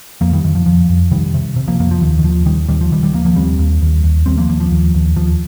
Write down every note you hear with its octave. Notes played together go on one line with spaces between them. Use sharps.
F2 F3 A#3
D#3 G3
F2 D#3
F3
F2 F3
F2
C3 D#3 G3
C3
C3
F3 A#3
F2 F3 A#3
F3
D#2 D#3
D#3
D#2 F3
D#2 D#3 G3
D#2 D#3 G3
F3
D#2 D#3 G3
D#3 G3
D#2 F3 A#3
F3 A#3
D#2 G3 C4
D#2
D#2
D#2
D#2 G3 C4
F3 A#3
D#2 F3 A#3
F3
D#2
D#2
D#2 F3